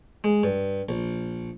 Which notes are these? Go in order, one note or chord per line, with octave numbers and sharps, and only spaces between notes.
G#3
G2
A#1